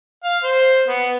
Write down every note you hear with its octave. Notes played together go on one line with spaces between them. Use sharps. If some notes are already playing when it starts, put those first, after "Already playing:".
F5
C5
B3